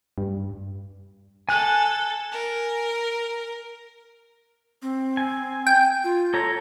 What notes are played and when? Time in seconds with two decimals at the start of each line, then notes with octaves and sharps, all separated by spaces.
0.18 G2
1.49 A4 G#5 F#6
2.31 A#4
4.82 C4
5.17 G#5
5.67 G5
6.04 F4
6.34 A4 C#5 A#5